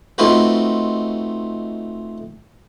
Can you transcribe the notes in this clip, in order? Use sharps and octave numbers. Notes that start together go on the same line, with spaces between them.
A3 C4 D#4 F4 F#4 B4